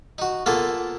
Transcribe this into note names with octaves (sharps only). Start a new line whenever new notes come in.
D#4 F#4
A#3 B3 F4 G#4 A4